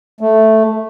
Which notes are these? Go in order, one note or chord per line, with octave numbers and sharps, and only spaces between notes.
A3